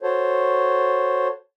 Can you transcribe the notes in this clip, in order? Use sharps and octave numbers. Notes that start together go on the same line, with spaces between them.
F#4 A4 C5 C#5